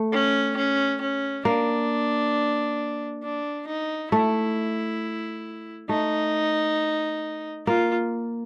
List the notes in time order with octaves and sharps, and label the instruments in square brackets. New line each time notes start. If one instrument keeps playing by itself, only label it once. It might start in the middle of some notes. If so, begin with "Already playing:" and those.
Already playing: [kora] A3
[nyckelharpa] C#4
C#4
C#4
[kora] A#3 [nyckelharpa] D4
[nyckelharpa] D4
D#4
[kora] A3 [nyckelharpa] E4
[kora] A3 [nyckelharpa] D#4
[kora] A#3 [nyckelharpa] F4